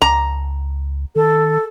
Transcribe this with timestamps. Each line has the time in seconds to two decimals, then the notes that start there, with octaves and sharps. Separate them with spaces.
0.02 C#2 A#5
1.16 D#3 A4